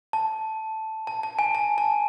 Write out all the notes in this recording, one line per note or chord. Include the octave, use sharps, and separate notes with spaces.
A5
A5
A5
G#5
A5
A5